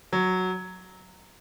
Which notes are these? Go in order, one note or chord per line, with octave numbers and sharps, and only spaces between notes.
F#3